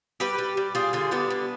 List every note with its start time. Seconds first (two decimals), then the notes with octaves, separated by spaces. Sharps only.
0.20 G3 G4 B4
0.38 G3
0.57 G3
0.75 G3 F4 G#4
0.93 D3 F4 G#4
1.11 G3 B3 D4
1.30 D3